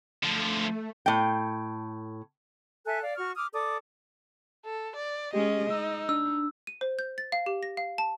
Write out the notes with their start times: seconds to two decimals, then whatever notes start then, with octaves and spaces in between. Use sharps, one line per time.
0.23 D3 F3 A3
1.06 A2 G5
2.86 A4 E5 G#5 F#6
3.02 D5 F5
3.16 F#4 C#6 F6
3.36 D6 D#6 F6
3.53 A4 D5 D6 D#6
4.65 A4
4.96 D5
5.33 G#3 C#4 G4 D#5
5.70 D#4 E6
6.09 D4 E6
6.67 D#7
6.81 C5
6.99 G6
7.18 A6
7.32 F5
7.46 G4
7.63 A#6
7.77 F5
7.98 A5